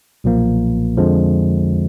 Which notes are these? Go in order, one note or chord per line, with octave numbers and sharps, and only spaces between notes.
B1 A#2 F3 A#3
F2 D3 F3 G#3